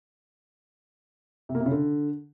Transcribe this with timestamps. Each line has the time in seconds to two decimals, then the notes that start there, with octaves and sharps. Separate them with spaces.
1.49 C3
1.55 A#3
1.60 C3
1.66 C#3
1.71 D3